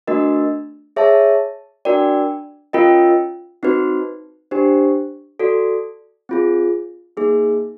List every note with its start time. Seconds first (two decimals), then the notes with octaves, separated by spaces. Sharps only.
0.07 A3 D4 F#4 A#4 D#5
0.96 G#4 C#5 E5 A5
1.85 D4 F#4 A#4 D5 G5
2.73 C#4 F4 A#4 D#5 G5
3.63 C4 D#4 F#4 B4
4.51 D4 G4 C5
5.39 F#4 A4 D5
6.29 C4 F4 G#4
7.17 A#3 D#4 G#4